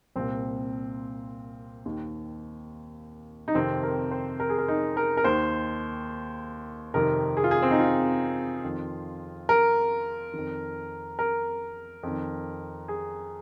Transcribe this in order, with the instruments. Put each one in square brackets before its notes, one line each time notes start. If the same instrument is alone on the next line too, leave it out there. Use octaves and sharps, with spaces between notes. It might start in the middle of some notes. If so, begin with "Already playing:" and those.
[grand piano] C2 A#2 C4
D#2 D#3
D#4
F2 C3 D#3 C4
A#4
C5
A#4
G#4
A#4
D#4
A#4
A#4
D#2 D#3 C5
F2 C3 D#3 A#4
G#4
F4
G#4
C4
D#4
F4
F2 D#3
A#4
F2 D#3
A#4
F2 D#3
G#4